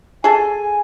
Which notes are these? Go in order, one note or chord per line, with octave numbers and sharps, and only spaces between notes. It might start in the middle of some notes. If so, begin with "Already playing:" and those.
G#4 A4 G#5